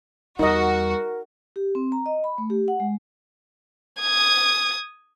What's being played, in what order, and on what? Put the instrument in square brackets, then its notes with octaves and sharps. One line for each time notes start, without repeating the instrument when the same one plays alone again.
[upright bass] E2 G3 [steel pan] D#4 D#5 [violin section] F#4 [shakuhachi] A#4
[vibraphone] G4
C4
A#5
D#5
B5
A3
G4
F#5
G#3
[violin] D#6 G#6